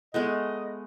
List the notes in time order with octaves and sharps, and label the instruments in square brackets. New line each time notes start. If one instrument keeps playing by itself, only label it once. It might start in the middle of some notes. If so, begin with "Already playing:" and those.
[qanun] G#3 A3 B3 [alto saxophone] D#5